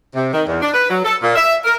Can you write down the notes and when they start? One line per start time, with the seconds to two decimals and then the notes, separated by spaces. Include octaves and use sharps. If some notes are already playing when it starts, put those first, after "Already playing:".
0.15 C3
0.33 D#3
0.46 E2
0.61 D4
0.74 B4
0.90 F#3
1.04 A4
1.22 A#2
1.36 E5
1.64 A#4